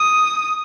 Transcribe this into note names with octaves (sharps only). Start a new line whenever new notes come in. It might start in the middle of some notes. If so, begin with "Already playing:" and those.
Already playing: D#6